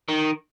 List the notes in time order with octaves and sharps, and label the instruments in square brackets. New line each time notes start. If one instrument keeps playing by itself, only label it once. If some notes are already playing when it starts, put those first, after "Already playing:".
[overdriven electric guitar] D#3